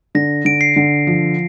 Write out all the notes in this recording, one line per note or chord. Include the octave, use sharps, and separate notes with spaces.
D3 A#6
D3 D7
C7
D3
F3